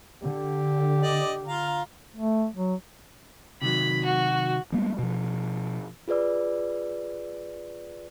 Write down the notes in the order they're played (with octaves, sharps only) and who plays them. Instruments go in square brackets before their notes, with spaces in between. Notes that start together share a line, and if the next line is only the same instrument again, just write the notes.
[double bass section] D3 [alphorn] G4
[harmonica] D5 D#5
F4 F5 A#5
[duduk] A3
F#3
[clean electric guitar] C3 D#3 F#3 [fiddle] B5
[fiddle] F#4
[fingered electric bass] G3 G#3 A#3 B3
B2 F3
[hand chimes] F4 G#4 B4 D5 E6